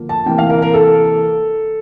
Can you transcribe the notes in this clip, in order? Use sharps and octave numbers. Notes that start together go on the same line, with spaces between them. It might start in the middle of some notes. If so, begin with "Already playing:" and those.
Already playing: D3 F3 A#3
A5
C3 E3 A#3 G5
F5
A#4
A#4
A4